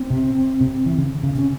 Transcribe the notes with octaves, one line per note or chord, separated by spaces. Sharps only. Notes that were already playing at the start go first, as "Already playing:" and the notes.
Already playing: C4
C3
C3
E3
C#3
C#3
C3 C#4